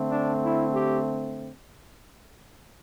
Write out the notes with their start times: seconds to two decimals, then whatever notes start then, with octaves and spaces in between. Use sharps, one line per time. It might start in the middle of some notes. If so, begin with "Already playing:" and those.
Already playing: D3 A3 C4
0.11 D4
0.43 E4
0.75 G4